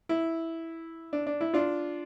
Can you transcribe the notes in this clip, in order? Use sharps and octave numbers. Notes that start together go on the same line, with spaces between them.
E4
D4
D4
E4
D4 F4